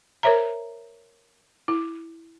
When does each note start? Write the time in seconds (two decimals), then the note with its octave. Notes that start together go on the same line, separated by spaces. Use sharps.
0.23 A#4 C5 C#5 E5 A#5
1.68 E4